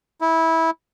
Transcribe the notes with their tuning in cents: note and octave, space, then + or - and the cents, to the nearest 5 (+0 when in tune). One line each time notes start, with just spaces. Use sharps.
E4 -15